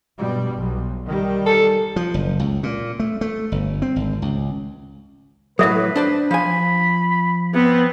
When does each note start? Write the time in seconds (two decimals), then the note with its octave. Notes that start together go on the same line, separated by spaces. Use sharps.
0.18 G2 B2 G3
0.57 B1
1.07 D#3 G3
1.46 A4
1.96 F3
2.14 F#1
2.39 C#2
2.63 A#2
3.00 A3
3.21 A3
3.52 G1
3.82 C4
3.96 G#1
4.22 C#2
5.59 A2 F#3 A4 B4 E5
5.96 D4 C5 D5
6.31 F3 G#5 B5
7.54 B3 C4